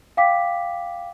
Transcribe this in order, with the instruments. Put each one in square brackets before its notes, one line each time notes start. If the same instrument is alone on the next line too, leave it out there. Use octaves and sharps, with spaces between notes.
[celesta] F5 G5 D6 B6